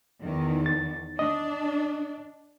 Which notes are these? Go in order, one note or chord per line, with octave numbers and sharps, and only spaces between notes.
E2 D#3
A6
D4 D#5